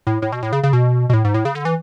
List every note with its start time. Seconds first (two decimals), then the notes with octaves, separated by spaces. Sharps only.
0.07 A2
0.22 A2
0.32 B2
0.43 A2
0.53 C#3
0.63 C#3
0.73 B2
1.09 B2
1.13 A2
1.25 G#2
1.34 A2
1.45 C#3
1.55 D3
1.65 E3